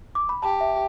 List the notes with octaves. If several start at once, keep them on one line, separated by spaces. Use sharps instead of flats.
D6
B5
G4 A5
E5